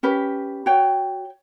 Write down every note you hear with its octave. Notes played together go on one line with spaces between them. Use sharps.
C#4 G4 B4
F#4 C#5 G5